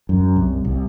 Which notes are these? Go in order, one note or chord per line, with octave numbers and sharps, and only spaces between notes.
F#2
C2
C2